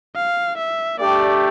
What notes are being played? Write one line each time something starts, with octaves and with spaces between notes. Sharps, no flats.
F5
E5
A3 D4 G4 D5